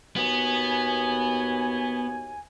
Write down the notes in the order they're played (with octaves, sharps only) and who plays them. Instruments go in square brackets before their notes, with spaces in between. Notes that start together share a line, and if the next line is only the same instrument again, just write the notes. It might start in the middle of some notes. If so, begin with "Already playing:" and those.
[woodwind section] D#2 F#4 G#5 [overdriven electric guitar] B3